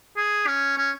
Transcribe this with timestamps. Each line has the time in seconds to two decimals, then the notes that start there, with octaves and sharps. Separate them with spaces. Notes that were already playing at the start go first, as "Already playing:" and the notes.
0.17 G#4
0.47 C#4
0.77 C#4